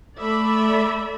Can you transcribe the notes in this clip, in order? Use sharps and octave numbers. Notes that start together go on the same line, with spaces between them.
A3 D5 E5 B5